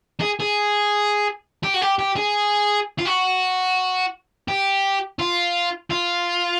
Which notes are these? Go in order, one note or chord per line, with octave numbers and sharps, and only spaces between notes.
G#4
G#4
G4
F#4
G4
G4
G#4
F4
F#4
G4
F4
F4